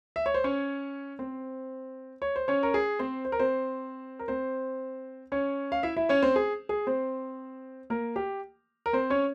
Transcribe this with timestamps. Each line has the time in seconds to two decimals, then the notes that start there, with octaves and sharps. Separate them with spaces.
0.16 E5
0.26 C#5
0.34 C5
0.44 C#4 C#5
1.19 C4 C5
2.22 C#5
2.36 C5
2.48 C#4 C#5
2.63 A#4
2.74 G#4
2.99 C4 C5
3.25 C5
3.32 A#4
3.39 C4 C5
4.19 A#4
4.28 C4 C5
5.32 C#4 C#5
5.72 F5
5.83 E4 E5
5.97 E4 E5
6.09 C#4 C#5
6.22 C4 C5
6.36 G#4
6.69 G#4
6.87 C4 C5
7.90 A#3 A#4
8.16 G4
8.86 A#4
8.93 C4 C5
9.10 C#4 C#5